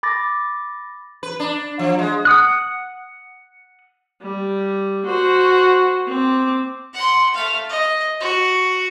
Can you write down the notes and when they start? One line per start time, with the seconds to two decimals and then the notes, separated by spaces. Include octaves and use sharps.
0.03 B5 D6 A6 A#6
1.23 B4
1.40 D4
1.79 F3
1.99 G#3
2.25 F#5 D#6 F#6
4.22 G3
5.06 F#4 C5
6.08 C4 D6
6.94 F#5 C6
7.34 A3 F5
7.69 D#5
8.20 F#4